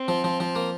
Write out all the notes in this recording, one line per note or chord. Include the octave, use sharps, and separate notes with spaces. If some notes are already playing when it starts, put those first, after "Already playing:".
Already playing: C4
F3
F3
F3
A#3